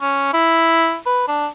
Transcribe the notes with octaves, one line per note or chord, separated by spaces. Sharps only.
C#4
E4
B4
D4